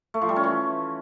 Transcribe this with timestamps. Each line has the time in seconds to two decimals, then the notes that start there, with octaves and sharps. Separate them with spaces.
0.14 A3
0.21 F3
0.29 G3
0.36 C#4
0.44 E3